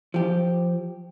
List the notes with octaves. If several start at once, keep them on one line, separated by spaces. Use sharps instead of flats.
F3 G4